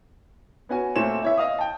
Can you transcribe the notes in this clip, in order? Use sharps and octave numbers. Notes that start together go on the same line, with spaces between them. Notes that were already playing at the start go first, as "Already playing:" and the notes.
B3 C#4 F#4 G#5
A#2 A3 C4 A4 C#5 E7
E4 C#5 E5
D#5 F5 D#6
G5 A5